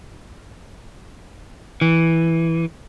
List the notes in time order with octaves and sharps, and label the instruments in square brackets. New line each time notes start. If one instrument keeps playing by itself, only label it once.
[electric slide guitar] E3